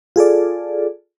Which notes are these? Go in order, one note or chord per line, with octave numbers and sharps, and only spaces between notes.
F4 G#4 A4 D5